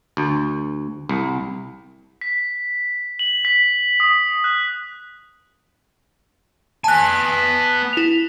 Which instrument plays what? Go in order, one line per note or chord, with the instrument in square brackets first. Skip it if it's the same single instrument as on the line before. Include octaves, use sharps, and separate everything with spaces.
[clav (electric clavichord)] D2
C2
[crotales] B6
F#7
B6
D#6
F#6
[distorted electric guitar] B3 G#5 [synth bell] A5 F#6
[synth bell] E4 F7